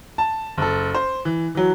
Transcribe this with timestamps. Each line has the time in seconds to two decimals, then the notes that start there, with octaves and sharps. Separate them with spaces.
0.18 A5
0.58 F#1 A4
0.95 C5
1.25 E3
1.55 E3 F#3